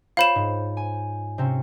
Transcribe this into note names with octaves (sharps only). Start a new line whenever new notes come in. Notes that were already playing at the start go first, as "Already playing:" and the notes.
F4 C5 C#5 F5 B5 E7
G#2
G#5
C3 C4 C#4